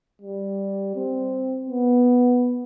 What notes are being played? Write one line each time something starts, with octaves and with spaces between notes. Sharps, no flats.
G3
C4
B3